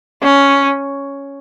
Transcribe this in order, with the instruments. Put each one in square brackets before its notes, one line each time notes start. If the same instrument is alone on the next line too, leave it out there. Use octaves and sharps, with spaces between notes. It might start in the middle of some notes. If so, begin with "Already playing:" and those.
[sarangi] C#4